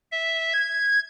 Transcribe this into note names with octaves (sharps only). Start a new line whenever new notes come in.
E5
G#6